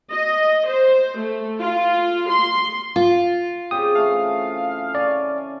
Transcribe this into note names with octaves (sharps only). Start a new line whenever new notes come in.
D#5
C5
A3
F4
C6
F4
C#3 C4 G4 D#6
E3 A3 F5
C#4 D5 G#5